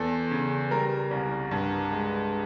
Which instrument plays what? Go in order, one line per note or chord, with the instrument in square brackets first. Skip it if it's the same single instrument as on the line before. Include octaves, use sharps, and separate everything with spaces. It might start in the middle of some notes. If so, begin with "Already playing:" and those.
Already playing: [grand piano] E2 A4
C#3
G3 A#4
C2
G2
G#3